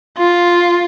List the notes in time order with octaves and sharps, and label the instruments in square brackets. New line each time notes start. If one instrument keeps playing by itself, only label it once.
[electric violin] F4